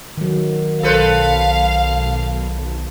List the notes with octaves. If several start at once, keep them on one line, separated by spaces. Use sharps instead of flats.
D#3 F#3
B1 A4 B4 C5 F5